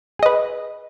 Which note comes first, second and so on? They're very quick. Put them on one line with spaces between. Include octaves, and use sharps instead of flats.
G#4 D#5 B4